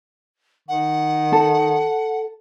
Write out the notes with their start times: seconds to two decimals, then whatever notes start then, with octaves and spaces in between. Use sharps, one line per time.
0.68 D#3 F#5
1.33 A4